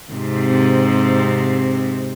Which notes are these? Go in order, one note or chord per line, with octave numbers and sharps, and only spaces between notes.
G#2 C3 C4